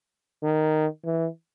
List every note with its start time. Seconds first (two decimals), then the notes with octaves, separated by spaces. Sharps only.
0.43 D#3
1.05 E3